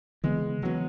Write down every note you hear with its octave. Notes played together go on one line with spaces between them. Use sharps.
C#3 E3 G#3 B3
C#3 E3 F#3 B3